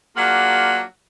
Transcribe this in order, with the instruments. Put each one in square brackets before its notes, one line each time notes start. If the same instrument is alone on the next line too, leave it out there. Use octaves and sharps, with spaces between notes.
[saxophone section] F#3 A#3 D4 F4 G#4 F#5